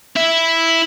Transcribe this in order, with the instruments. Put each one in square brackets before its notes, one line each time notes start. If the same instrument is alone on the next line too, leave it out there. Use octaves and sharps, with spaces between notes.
[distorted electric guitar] E4 E5